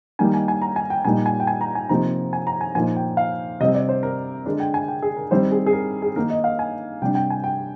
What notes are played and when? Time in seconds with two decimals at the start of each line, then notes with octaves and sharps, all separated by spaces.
0.19 D#3 G3 A#3 D#4 G#5
0.34 G#5
0.48 G#5
0.62 A#5
0.76 G#5
0.90 G5
1.05 A#2 G3 A#3 D#4 G#5
1.26 G#5
1.40 G5
1.47 G#5
1.61 A#5
1.75 G#5
1.89 C3 F3 A#3 D#4 A#5
2.33 G#5
2.47 A#5
2.61 G#5
2.75 A#2 F3 A#3 D#4 G#5
2.97 G5
3.17 F5
3.60 C3 G3 C4 D#5
3.75 D5
3.89 C5
4.03 A#4
4.46 D3 G#3 D4 A#4
4.60 G5
4.74 G#5
4.88 G5
5.02 G#4
5.17 A#4
5.31 D#3 G3 C4 D#4 C5
5.52 G#4
5.66 G#4
5.73 A#4
6.02 G#4
6.16 D#3 A#3 D#4 A#4
6.30 D#5
6.44 F5
6.59 G#5
7.02 C3 G3 D4 G5
7.15 G5
7.30 G#5
7.44 G5